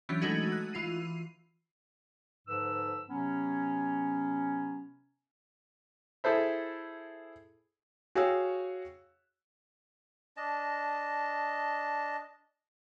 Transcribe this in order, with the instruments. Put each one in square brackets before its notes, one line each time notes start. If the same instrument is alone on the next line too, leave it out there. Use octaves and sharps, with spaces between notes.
[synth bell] E3 F#3 C#4 D4 G6 B6
E3 G#3 A3 D#4 F#4 G#6
F#6
E3 F4 C7 D#7
[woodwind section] G#2 D3 F3 B4 E6
C3 F#3 B3 C#4
[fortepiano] E4 G#4 A4 C5 E5
[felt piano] F#4 G#4 C#5 F5 G5 E6
[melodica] D4 D#5 A5